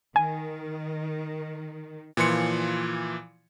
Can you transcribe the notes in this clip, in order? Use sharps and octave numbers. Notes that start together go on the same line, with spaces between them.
D#3 G#5
A#2 E3 F3 C6 C#7